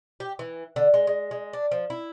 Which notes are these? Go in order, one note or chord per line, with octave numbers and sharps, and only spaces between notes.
G4
E3
D3
G#3
G#3
G#3
D4
F3
E4